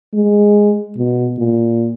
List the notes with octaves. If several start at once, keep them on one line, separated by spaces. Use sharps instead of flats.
G#3
B2
A#2